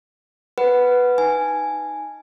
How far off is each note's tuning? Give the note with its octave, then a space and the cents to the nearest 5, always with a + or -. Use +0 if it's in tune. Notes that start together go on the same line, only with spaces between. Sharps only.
B4 +0 F#5 +0
D#4 +5 G#5 -5